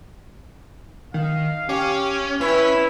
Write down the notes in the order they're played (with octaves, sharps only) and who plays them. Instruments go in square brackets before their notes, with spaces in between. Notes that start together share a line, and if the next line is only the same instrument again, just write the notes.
[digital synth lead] D#3 [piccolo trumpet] F5
[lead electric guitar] C#4 [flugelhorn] G4 [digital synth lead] D6
[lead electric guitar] C#4 [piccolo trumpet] E4 [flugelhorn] B4 [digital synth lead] B6